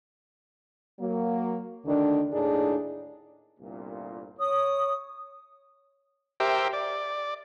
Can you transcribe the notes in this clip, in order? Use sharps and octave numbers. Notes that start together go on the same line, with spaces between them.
F#3 A#3
D2 D3 D#3 D4
D#2 A2 D4 D#4 G#4
G1 C2 A#2
C#5 D#6
G4 A#4 C5 E5 G5
D5